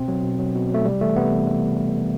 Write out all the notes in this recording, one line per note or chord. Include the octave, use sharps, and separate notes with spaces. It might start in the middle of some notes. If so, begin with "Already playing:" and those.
Already playing: B2 C4
F#3
B2
F#3
B2
F#3 A3
C3 G3
E3 A3
C3 B3
E3